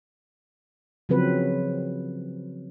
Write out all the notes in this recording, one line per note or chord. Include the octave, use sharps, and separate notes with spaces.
C#3 F3 F#3 C4 B4